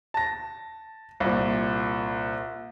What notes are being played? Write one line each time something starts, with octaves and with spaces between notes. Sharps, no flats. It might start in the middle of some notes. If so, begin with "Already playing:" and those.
A5 A#6
C2 A#2